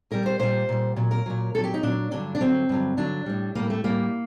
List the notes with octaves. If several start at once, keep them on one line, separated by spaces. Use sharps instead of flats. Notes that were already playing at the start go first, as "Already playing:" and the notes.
A#2 G3 A#4
C5
A#2 G3 C5
A#2 G3
A#2 F#3
A#4
A#2 F#3
A#2 F#3 A4
G4
D#4
A#2 F#3 D4
G2 D3 F#3 D4
D4
G2 D3 F#3 C4
G2 D3 F#3
G2 D3 F#3 D4
A2 G3
A2 G3 A#3
A3
A2 G3 A#3